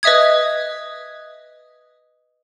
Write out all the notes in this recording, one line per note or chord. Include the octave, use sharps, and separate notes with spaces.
B4 D#5 E5 D#6 G#6